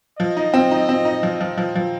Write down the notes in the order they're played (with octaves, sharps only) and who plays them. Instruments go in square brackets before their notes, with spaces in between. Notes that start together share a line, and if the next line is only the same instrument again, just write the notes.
[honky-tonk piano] F3 [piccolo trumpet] D#5
[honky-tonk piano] D#4
C4
D#4
C4
D#4
F3
F3
F3
F3